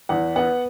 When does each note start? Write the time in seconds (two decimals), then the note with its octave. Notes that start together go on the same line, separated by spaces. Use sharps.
0.09 E2 F#5
0.36 B3 F#5